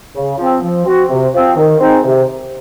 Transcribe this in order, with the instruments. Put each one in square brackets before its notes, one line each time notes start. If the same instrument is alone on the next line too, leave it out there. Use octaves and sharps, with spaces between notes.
[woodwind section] C#3
F3 C4
F3
C4 F#4
C3
F3 C4
D#3
G#3 C4 D#4
C3